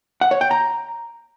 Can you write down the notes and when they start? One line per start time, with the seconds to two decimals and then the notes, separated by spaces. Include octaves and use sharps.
0.21 F#5
0.31 C#5
0.41 G5
0.51 A#5